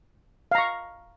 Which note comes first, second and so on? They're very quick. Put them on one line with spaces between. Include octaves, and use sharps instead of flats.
F5 A#5 C#6